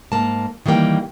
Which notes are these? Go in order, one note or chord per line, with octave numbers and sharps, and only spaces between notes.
G#2 A#3 A5
D#3 E3 G3 A#3 G5